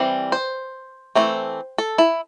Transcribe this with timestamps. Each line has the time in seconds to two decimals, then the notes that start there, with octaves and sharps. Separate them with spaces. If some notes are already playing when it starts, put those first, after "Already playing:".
Already playing: E3 G3 C4
0.32 C5
1.15 E3 A3 C4
1.78 A4
1.98 E4